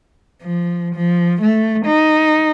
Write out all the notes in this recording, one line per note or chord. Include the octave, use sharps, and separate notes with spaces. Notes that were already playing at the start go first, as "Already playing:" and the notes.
F3
F3
A3
D#4